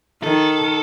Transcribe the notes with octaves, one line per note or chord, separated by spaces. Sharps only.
D#3 A4